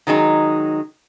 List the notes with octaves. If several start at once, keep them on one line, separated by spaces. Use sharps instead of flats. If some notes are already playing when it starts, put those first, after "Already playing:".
D#3 F#3 G#3 D#4